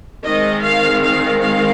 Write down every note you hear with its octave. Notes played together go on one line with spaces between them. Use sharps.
D#3 G#3 C4 D#5
F5
F5
F5